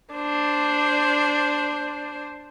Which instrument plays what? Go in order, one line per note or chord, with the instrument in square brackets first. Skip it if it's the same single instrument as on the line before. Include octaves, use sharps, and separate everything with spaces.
[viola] D4 C5